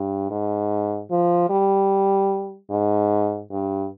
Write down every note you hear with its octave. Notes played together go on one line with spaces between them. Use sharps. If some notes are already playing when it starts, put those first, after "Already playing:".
Already playing: G2
G#2
F3
G3
G#2
G2